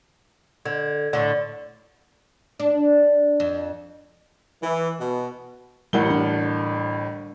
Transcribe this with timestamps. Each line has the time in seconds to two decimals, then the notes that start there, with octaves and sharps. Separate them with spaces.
0.65 D3 G#6
1.13 A2 D3 D5
2.60 D4
3.40 F2
4.63 E3
5.00 B2
5.93 A1 A2 G3 A#4 F#5 G7
6.10 D4